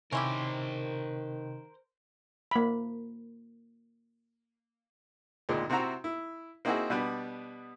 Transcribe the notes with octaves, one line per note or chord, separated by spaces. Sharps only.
C3 D#3 C#4 E4 G4 A#4 C5
A#3 B5
G#1 D2 A#2 G#3
C3 C4 E4 F#4 A#5
E4
A#3 C4 D#4 E4 F#4 G#4
B2 G3 B3 D4